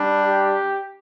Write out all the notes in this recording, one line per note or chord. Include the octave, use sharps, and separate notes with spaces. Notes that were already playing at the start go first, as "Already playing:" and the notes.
Already playing: G3 D4
G4